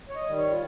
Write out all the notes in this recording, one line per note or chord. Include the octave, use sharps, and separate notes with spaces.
C#5
D#5
D#3 G3
C#5
F4